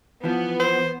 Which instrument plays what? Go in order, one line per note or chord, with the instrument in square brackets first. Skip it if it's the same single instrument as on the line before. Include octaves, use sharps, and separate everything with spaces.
[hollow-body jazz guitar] E3 F3 [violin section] B3
[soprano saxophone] C5